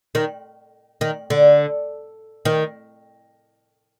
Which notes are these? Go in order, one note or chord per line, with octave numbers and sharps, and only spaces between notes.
D#3
D#3
D3
D#3